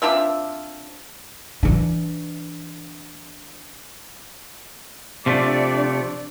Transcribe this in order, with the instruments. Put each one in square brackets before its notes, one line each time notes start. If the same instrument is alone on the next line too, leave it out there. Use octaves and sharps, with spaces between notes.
[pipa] C4 D4 F4 E5
[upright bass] E3 D4
[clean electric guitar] C3 F3 A3 [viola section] D4 D5